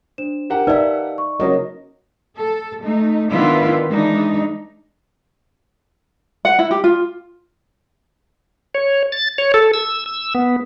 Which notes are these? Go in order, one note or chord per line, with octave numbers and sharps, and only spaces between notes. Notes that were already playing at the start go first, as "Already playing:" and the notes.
D4 C5 E7
G4 A#4 F#5
D#4 B4 D5 E5 F5 A5
C#6
C#3 F#3 A#3 D#5
A4
A3 D#4
D#3 B3 D4 E4 F4 B4
E3 G#3 D4 D#4
F#5
E4
G4
F4
C#5
A6
C#5
A4
E6
E6
B3